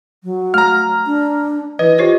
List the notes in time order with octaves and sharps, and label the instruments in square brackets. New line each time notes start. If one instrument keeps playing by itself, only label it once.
[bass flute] F#3
[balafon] A3 [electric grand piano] A#5 F6
[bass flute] D4
[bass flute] E3 [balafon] B4 [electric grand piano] D#5
[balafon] F4 C5 C#5 [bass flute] G4